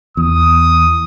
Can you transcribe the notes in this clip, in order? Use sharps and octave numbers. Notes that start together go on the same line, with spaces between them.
E2 D#6